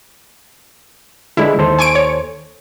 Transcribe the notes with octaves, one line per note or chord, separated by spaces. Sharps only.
D3 G#3 E4
D#2 A4 C5
G#5 C#6 D7
C#5